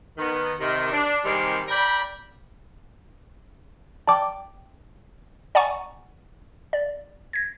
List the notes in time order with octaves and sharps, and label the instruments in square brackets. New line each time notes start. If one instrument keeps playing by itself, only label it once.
[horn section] D#3 B3
C3 D#3
D4
C3 D#3 G3 G#3 A#3 C4
A#4 D5 G5 B5
[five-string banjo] D5 G5 [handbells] A5 D6
[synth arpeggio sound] D5 F#5 G#5 A#5 C#6
D5
G#6 A#6